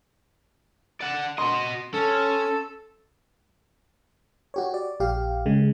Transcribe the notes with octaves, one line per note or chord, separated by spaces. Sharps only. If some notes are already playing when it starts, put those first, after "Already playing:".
D5 F#5
F#4 D#5 C6
C#4 A4
F#4 G4 C#5
D5
A#1 G4 F5
C#3 G#3